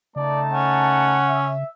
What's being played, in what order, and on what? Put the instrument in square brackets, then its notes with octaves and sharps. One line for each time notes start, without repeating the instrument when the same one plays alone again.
[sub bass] C#3 [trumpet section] A3 D#4 A5 [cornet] D5
[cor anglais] C#4 [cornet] F#5
[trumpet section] E5